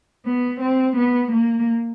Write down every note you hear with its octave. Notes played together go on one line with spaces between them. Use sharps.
B3
C4
B3
A#3